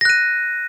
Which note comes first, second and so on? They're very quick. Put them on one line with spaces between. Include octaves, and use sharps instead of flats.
A#6 F#6 D#7